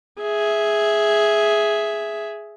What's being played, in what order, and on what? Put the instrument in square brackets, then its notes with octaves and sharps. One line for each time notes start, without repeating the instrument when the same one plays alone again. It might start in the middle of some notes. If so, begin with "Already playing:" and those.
[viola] G#4 E5